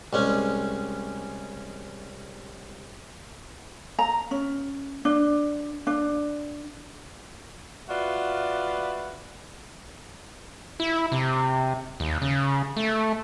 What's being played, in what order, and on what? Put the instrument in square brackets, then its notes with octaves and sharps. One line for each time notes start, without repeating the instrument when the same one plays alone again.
[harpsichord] C2 G#3 C#4
[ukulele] A#5
C#4
D4
D4
[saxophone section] F4 F#4 B4 D5 E5
[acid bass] E4
C3
D#2
C#3
A3